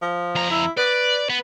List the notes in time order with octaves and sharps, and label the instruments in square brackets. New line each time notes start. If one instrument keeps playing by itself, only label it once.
[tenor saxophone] F3
[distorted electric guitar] F2 A#5
[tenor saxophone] E4
[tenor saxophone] B4 [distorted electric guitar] D5
[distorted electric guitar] B3